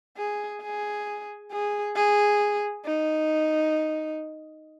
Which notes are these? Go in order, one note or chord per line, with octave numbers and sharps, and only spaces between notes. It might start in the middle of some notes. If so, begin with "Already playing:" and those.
G#4
G#4
G#4
G#4
D#4